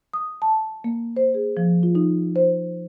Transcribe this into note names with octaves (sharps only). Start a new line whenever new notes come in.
D#6
A5
A#3
C5
G#4
F3
F4
D#4
C5